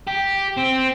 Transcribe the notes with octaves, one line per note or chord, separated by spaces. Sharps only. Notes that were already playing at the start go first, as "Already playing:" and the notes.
G4
C4